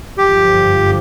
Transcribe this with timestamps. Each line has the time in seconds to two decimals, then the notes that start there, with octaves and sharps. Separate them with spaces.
0.18 G1 F#2 D3 F3 G4